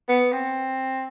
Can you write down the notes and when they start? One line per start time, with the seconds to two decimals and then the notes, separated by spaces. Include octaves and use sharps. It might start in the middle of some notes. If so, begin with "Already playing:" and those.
0.09 B3
0.32 C4